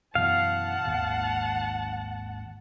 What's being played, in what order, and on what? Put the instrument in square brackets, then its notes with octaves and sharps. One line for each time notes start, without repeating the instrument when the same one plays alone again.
[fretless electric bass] F#2 B2 E3 [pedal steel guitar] F5 [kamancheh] F#5 A5
[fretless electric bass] G#1 D#2